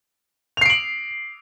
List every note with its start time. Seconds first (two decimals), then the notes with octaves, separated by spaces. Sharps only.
0.57 F7
0.61 C7
0.66 D7
0.70 F#7